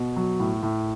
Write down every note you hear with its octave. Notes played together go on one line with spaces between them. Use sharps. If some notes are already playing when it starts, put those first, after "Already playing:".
Already playing: B2
F#3
A2
A2